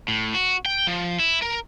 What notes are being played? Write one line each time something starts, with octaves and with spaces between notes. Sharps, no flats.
A2
F#4
G5
F3
E4
A#4